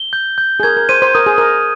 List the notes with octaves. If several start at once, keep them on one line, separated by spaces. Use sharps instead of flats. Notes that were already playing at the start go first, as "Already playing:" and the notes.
Already playing: G7
G6
G6
G#4
A#4 G#6
A#4
C5 D#7
C5
A#4 D#6
G#4
A#4 D#6